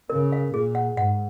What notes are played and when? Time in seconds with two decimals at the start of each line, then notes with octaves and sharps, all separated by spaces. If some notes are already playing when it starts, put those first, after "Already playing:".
0.10 C#3 A#4
0.32 F5
0.53 A#2 G#4
0.75 F#5
0.97 G#2 F#5